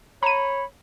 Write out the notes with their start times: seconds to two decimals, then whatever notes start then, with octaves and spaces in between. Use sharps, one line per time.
0.23 C#5 A#5 B5 D#7